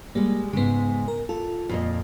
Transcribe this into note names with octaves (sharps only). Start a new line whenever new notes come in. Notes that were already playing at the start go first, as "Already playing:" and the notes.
G3 G#3 A#3
G#2 C#3 G#3 B3
A#4
F4 A4
F2 A#2 D#5